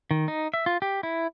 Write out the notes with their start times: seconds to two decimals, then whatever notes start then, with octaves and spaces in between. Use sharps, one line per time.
0.11 D#3
0.28 D#4
0.54 E5
0.66 F4
0.82 G4
1.03 E4